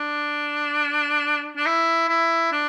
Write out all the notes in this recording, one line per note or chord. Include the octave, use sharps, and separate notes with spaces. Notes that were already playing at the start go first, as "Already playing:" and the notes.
Already playing: D4
D4
E4
E4
D4